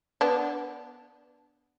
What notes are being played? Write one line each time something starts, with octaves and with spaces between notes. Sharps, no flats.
B3 D4